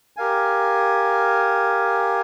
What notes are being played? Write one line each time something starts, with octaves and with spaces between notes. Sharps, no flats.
G4 A#4 F5 G#5